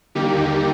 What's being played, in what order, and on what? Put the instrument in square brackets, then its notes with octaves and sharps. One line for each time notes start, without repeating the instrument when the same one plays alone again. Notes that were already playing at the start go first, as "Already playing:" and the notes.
[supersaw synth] D#2 D3 G3 A#3 D#4 G4